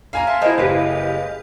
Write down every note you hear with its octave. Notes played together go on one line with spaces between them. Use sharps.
A#3 F5 G#5 A#5
E5 A5 C6
G#3 E4 A#4 C5
F#1 G4 B4 F5